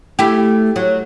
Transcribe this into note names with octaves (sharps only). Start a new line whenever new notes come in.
A3 E4 G4
F#3